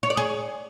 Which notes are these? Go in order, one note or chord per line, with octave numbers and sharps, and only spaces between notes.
C#5
D5
G#4